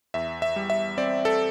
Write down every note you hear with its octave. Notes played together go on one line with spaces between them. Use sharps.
E2 E5
E5
G3
E5
C4 D5
A4